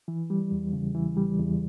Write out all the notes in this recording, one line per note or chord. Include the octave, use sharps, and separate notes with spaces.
E3
G3
E2
C#3
E3
G3
E2